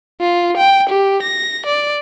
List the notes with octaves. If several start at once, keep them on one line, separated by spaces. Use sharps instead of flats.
F4
G5
G4
A#6
D5